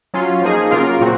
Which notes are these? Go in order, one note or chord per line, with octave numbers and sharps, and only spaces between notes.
F#3 C#4 F4
F3 A#3 D#4 G#4
C#3 F#3 A#3 F4 A#4
A#2 F#3 C4 F#4